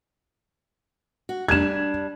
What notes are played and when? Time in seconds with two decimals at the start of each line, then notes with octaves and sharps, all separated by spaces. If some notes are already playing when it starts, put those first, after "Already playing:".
1.29 F#4
1.48 G3 D4 G#6 E7